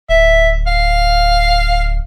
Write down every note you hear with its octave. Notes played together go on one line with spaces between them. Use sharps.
D1 E5
F5